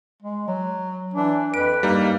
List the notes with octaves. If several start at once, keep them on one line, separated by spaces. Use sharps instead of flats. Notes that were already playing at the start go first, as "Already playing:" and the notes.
G#3
F#3
E3 D4
F2 B4 D7
G2 G3 A#3 D#4